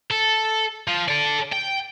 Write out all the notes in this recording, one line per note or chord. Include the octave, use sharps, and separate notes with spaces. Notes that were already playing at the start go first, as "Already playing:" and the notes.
A4
F3
A4 D5
G5